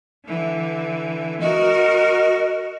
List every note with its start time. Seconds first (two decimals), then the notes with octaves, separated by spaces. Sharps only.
0.26 D3 E3
1.41 F#4 A#4 D#5